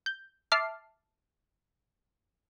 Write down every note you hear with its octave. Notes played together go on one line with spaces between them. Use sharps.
G6
E5 A5 D6 F6 C7